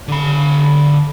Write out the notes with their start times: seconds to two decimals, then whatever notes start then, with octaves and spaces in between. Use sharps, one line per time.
0.08 D3 B5